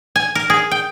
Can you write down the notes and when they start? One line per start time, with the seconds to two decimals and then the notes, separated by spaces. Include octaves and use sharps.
0.16 G#5
0.35 A#4
0.50 G#4
0.71 G5